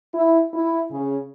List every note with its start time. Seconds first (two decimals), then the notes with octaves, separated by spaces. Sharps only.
0.14 E4
0.53 E4
0.91 C#3